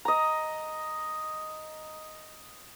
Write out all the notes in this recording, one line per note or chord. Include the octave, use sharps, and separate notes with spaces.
D#5 A#5